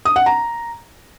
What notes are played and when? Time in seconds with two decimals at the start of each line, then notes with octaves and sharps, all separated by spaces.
0.05 D#6
0.16 F#5
0.26 A#5